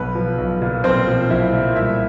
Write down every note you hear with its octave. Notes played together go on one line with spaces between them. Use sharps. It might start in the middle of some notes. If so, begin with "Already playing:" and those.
Already playing: B1 B3 B4
F3
B1
A#2
B1 C4 C5
F3
B1 E4 E5
A#2
C2 E4 E5